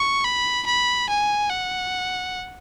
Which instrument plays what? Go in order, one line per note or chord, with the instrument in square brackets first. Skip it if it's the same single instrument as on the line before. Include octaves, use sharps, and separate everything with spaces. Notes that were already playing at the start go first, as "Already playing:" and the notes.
Already playing: [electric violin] C#6
B5
B5
G#5
F#5